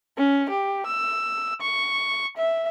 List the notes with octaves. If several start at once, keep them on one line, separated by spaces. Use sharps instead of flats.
C#4
G4
E6
C#6
E5